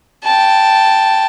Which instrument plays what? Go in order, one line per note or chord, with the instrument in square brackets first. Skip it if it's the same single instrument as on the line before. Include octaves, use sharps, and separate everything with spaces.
[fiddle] G5 A5